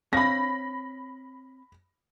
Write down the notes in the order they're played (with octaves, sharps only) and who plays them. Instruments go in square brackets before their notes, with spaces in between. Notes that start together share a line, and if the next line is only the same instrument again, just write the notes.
[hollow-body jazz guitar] C4 C#5 F5 [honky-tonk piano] B5 A#6